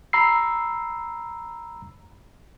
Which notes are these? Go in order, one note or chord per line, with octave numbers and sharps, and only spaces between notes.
A#5 B5 E6 C7